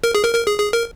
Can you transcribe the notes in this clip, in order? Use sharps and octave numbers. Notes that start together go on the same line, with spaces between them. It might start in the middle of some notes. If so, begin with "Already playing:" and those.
A#4
G#4
A#4
A#4
G#4
G#4
A#4